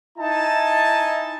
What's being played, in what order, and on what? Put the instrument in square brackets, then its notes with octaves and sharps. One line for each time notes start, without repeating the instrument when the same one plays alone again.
[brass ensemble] D#4 E4 G#5 A5